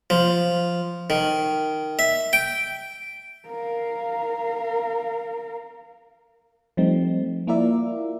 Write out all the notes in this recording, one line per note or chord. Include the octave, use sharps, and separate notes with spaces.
F3
D#3
E5
G5
A#4 F5
F3 G3 A3 C4 D#4
A#3 E4 F4 A#4 D5 E5